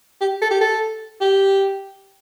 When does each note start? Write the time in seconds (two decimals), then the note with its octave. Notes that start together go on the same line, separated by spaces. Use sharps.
0.21 G4
0.41 A4
0.50 G4
0.61 A4
1.21 G4